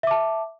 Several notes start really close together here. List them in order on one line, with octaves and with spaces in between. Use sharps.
E5 D6 A5